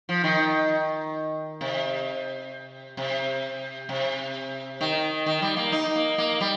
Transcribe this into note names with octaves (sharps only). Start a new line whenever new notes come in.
F3
D#3
C3
C3
C3
D#3
D#3
G3
A#3
D#4
A#3
A#3
G3